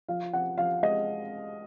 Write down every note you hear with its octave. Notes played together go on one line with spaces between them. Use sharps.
F3 F5
F3 F#5
F3 F5
G#3 D#5